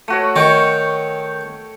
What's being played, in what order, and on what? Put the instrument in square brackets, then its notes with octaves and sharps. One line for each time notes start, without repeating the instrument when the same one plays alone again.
[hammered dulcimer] A3 F#4 C#5
[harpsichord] D#3 [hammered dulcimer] C#5 G5 C#6